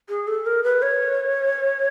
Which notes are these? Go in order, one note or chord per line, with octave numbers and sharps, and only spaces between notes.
G#4
A4
A#4
B4
C#5